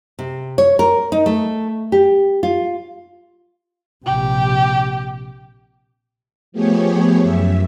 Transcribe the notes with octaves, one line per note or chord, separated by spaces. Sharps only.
C3
C#5
A#4
D#4
A3
G4
F4
A#1 C3 G4 G5
F3 A3 B3 G4 G#4 C#5
F#2 E5